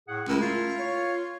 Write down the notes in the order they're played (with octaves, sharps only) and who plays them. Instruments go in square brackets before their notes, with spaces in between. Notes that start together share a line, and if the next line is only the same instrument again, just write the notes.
[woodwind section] A2 G#4 F#5
[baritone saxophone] C#2 [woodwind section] A3 E4 A#4
[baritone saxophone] F4
[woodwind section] C#5